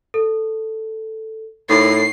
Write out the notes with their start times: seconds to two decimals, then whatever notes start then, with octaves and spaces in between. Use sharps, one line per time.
0.14 A4
1.69 A2 D#4 C7